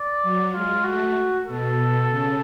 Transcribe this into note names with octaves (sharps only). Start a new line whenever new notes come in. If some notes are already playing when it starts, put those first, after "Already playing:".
Already playing: D5
F#3
G#3 F4
A3 F#4
B2 A4
C#3